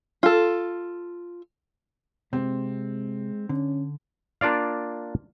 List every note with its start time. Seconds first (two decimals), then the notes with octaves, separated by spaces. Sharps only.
0.23 F4 A4
2.33 C3 G#3 C4
3.49 D3 C#4
4.41 A#3 D4 F4 D5 F5